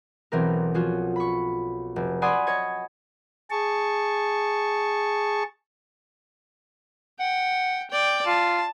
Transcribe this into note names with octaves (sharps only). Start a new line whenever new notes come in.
B1 E3 C4 A#4
F3 C#4 F4 F#4
B5 C#6
F1
D5 F#5 G#5 B5 C6 D#6
C#5 D#5 C#6 G#6
G#4 A5 C#6
F#5 G5
D5 G5
F4 A5